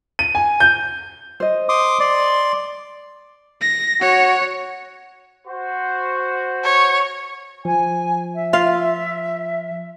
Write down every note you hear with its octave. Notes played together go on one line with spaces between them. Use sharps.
D#7
G#5
G6
C5 D#5
C6 D6 D#6
D5 C6
A#6
F#4 C#5
F#4 C5
C#5
F3 G#5
E5
F4 F5